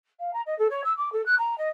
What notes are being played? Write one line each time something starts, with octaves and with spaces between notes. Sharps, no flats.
F5
A#5
D#5
A4
C#5
E6
D6
A4
F#6
A#5
D#5